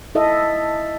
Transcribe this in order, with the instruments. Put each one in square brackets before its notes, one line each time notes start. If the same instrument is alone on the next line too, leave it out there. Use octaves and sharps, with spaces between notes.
[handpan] E4 A4 D#5 E5